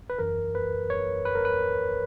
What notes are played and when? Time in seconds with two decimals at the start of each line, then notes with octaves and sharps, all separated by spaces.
0.10 B4
0.19 G#1 F#2 E3 A#4
0.55 B4
0.90 C#5
1.25 B4
1.35 A#4
1.45 B4